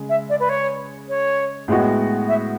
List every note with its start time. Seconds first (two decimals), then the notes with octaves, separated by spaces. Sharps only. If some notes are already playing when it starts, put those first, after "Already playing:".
Already playing: C#3 G#3
0.09 E5
0.29 D5
0.40 B4
0.49 C#5
1.09 C#5
1.68 A2 G#3 B3 F#4
2.28 E5